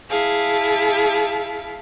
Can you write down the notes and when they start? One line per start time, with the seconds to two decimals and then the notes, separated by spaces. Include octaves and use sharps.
0.10 E4 G#4 F5 A5